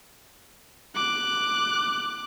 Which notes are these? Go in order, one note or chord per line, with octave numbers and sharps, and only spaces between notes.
D6 F#6